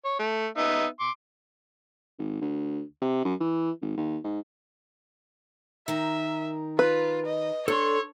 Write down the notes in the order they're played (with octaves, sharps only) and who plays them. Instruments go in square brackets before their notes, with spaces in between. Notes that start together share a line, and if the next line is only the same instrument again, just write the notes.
[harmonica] C#5
A3
B3 D#4 E5
C6 D6
[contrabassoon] G#1
D2
C3
F#2
E3
G#1
D#2
G#2
[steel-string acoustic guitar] D#3 A#4 [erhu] E5
[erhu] F4 [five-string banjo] B4
[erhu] D#5
[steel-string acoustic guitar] D4 [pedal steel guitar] A4 C6 [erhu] C#5